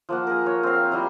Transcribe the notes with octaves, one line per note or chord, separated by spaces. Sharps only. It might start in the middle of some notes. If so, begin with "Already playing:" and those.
F3 A#3 F#5
G#4 A#4
C#5
C4 F5
G3 E4 F5 A#5